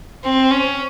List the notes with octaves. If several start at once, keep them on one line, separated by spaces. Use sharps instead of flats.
C4
C#4